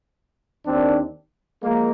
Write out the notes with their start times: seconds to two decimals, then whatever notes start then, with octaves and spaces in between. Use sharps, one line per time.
0.65 D#2 D#3 C4 D4
1.62 F3 G#3 A#3